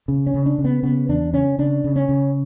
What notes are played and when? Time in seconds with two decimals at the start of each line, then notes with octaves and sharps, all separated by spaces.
0.08 C#3
0.27 C#4
0.34 C#3
0.46 D4
0.58 C#3
0.64 B3
0.83 C#3 B3
1.09 E2 D4
1.33 C#3 C#4
1.59 C#3 D4
1.84 C#3
1.96 C#4
2.09 C#3